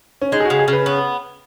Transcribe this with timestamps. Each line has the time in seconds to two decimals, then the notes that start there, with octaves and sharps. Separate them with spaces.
0.21 C#4
0.32 G#3 D#4
0.40 G#4
0.45 C#3 F#4
0.59 G#4
0.68 C#3
0.73 B4
0.86 B3 C#5